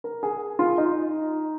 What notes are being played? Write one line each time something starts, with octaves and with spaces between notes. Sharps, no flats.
A#4
G#4
F4
D#4